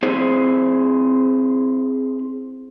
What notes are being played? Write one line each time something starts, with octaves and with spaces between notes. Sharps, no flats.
C4 E4 G#4 C5